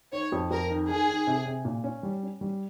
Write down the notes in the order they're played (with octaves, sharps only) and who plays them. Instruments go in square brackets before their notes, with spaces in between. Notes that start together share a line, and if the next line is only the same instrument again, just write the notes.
[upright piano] D#3 [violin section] C#5
[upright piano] F2
[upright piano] F2 [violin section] A#4
[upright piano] D#3
[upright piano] D#3 [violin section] G#4
[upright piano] D#3
C3
C3
A#2
C#4
G3
C#4
G3